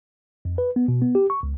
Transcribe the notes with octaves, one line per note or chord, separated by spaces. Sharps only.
F2
B4
B3
B2
B3
G4
C#6
C#2